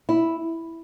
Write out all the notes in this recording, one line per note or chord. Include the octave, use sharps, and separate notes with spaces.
E4